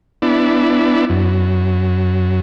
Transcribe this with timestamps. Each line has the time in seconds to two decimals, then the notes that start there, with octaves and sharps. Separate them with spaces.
0.22 B3 D4 E4
1.10 F#2